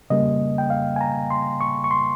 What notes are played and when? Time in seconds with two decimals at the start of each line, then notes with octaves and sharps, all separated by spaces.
0.10 C#3 G3 A#3 D#5
0.58 G5
0.70 F5
0.96 G#5
1.01 A#5
1.30 C6
1.61 C#6
1.84 C#6
1.91 C6